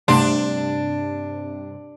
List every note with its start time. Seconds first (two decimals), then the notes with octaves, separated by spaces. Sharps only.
0.08 G2 C3 A3 D4 C6